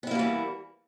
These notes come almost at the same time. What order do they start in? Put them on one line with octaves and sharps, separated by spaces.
B3 E4 A#3 G3 E3